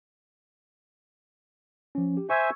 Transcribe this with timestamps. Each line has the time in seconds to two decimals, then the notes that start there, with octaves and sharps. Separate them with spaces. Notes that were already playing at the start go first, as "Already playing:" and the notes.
1.95 F3 C#4
2.17 G4
2.30 C5 E5 G#5 C#6 E6 G#6